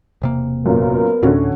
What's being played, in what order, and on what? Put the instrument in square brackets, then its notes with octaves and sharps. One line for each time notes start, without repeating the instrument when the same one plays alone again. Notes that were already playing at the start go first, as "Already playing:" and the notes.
[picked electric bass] E1 C3 A#3
[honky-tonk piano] F#2 A#2 [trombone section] B3 A#4
[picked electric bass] D2 A2 [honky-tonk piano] D3 C#4 F#4